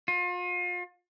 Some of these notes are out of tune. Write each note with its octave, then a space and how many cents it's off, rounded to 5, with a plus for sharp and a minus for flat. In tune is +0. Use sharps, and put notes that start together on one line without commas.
F4 +35